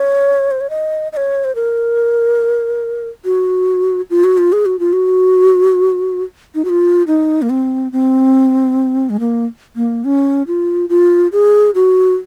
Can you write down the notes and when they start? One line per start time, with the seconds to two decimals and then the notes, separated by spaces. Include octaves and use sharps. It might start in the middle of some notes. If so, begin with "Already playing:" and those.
Already playing: C#5
0.51 C5
0.61 C#5
0.70 D#5
1.13 D#5
1.17 C#5
1.44 C5
1.55 A#4
3.25 F#4
4.10 F4
4.24 F#4
4.38 F4
4.52 G#4
4.66 F#4
4.79 F4
4.93 F#4
6.55 D#4
6.65 F#4
6.69 F4
7.07 D#4
7.42 A#3
7.50 C4
7.92 C4
9.10 G#3
9.20 A#3
9.76 A#3
10.05 C#4
10.47 F4
10.89 F4
11.32 G#4
11.75 F#4